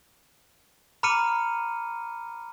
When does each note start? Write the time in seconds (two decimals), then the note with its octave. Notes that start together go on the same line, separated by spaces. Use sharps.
1.03 A#5 B5 D6 F6 C#7 D#7